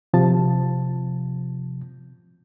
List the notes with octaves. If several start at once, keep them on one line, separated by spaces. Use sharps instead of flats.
C3 F3 A5